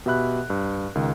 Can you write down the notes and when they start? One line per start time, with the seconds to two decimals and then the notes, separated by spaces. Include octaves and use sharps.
0.06 B2 G4 E5 B5 F#6
0.50 G2
0.95 C#2 D#3